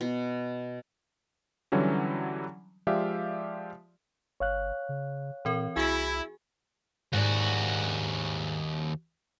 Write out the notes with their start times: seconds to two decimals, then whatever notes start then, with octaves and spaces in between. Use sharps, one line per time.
0.01 B2
1.72 D3 E3 F#3 G3 C#4 E4
2.87 F3 G#3 G4 D5 E5 F5
4.40 G1 C#5 F5 F#6
4.89 C#3
5.45 A#2 E3 C4 A#4
5.76 C2 E4 F#4 G#4 G#5
7.13 D#2 G#2 F#4 D5